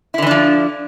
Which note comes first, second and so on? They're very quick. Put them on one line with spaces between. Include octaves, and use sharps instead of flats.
E4 D3 E3 D4 F3